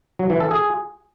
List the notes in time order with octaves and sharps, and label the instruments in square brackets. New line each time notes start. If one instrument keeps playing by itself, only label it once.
[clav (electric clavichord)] F#3
E3
A4
G#4